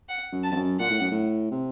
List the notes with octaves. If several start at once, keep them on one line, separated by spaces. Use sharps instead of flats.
F#5
F#2
A5
F2
F#2
A#2 F#5
A2
F#2
A2
C3